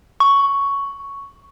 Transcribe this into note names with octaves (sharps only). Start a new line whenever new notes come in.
C#6